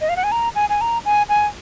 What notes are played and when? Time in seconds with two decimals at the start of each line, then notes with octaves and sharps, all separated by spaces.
0.01 D#5
0.09 F5
0.16 F#5
0.24 G#5
0.32 A#5
0.55 G#5
0.70 G#5
0.81 A#5
1.05 G#5
1.29 G#5